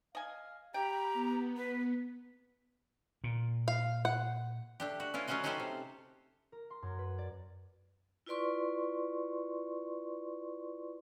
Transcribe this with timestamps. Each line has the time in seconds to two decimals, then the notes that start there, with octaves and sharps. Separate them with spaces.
0.15 D#5 F5 G#5
0.74 G4 G5 A#5 B5
1.14 B3
1.57 B4
3.24 A#2
3.68 F5
4.05 F#5
4.80 A3 D4 G4
5.00 F#4
5.14 C#4 E4 F4 B4
5.27 F#3 A3 C#4 F4 F#4 D#5
5.44 C#4 D#4 F#4 G4 A4 C5
5.60 C3
6.52 A#4
6.70 C6
6.82 F#2
6.99 B4
7.18 D5
8.26 E4 F4 B4 D5 C6 C#6